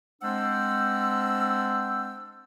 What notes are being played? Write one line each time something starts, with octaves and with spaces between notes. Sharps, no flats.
G#3 C4 D4 C5 F#5 E6